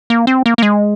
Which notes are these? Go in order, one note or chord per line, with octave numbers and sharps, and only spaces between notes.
A#3
C4
A#3
A#3
G#3